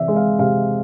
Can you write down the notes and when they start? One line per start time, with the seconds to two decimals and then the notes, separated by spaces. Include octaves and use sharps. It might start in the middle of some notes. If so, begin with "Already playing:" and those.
Already playing: C3 E3 D5 E5
0.08 G#3
0.16 F5
0.39 C3 F5